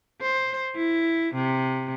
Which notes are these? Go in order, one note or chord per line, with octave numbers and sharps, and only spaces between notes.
C5
E4
C3